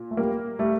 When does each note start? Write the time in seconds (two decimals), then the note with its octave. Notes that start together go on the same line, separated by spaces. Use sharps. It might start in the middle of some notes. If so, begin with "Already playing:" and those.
Already playing: A#2
0.11 A3
0.17 G3 A#3
0.59 G3 A3